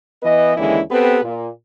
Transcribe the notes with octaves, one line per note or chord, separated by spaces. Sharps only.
E3 B3 B4 D#5
D#2 D3 E3 G#3 C#4 E4
B3 C4 G4 A4 B4
A#2